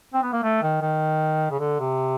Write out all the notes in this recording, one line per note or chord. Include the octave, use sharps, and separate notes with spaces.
C4
B3
A#3
A3
D#3
D#3
C#3
D3
C3